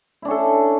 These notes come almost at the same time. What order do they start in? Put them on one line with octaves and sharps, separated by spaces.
E4 D4 C#4 A4